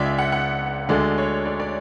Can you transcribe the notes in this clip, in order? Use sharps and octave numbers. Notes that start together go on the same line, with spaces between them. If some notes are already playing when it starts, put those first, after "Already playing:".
Already playing: C#2 C#3 G#3 D5 E5
F#5
F#5
D2 D3 G#3 D5
C#5
D5
D5